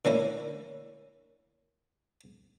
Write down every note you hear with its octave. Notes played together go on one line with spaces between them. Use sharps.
D3 A#3 C#4 E4